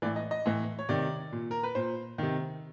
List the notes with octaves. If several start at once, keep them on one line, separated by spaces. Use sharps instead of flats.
A2 E3 D5
D#5
D#5
A2 E3
C#5
C3 D#3 D5
A#2
A#4
B4
A#2 C5
C3 D#3